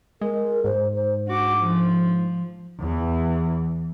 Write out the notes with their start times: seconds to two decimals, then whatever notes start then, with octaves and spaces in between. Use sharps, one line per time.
0.21 G#3 A#4
0.64 G#2 C5
0.95 C5
1.27 D4 F#4 D6
1.59 F3
2.79 E2 E3